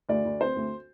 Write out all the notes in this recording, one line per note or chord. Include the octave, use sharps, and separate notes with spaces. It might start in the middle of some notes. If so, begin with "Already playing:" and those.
D2 D5
D2
C4 C5
D2